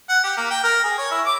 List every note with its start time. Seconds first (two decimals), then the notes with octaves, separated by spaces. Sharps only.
0.09 F#5
0.24 G4
0.37 A#3
0.51 G5
0.63 A#4
0.84 G#4
0.98 C#5
1.11 E4
1.26 D6